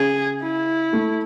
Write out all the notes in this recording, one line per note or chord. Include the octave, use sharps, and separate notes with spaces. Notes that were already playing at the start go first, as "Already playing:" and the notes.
Already playing: C#3 G#4
E4
A3